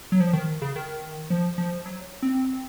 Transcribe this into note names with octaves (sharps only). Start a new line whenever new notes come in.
F#3
F3
D#3
C#3
D#3
F3
F3
F#3
C4